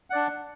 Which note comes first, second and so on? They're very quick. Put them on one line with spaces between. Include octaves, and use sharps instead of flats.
F#5 D5 D4